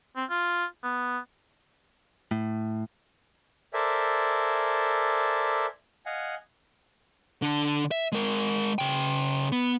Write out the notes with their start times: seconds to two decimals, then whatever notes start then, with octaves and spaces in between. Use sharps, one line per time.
0.16 C4
0.30 F4
0.83 B3
2.31 A2
3.74 A4 A#4 C5 D5 E5 G#5
6.06 D#5 F5 F#5 G#5
7.42 D3 D4
7.91 E5
8.12 G#3 A#4
8.79 C#3 G5
9.52 B3